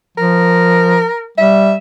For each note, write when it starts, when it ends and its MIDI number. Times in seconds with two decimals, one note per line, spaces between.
0.18 1.05 53
0.18 1.29 70
1.38 1.77 55
1.38 1.75 76